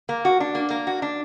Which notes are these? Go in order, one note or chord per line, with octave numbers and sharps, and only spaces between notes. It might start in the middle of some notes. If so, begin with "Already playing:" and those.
A#3
F#4
D4
A#3
A#3
F#4
D4